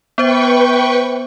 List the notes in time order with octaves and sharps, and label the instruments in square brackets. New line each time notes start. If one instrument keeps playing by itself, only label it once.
[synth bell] B3 C5 E5 [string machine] B4 G5 C#6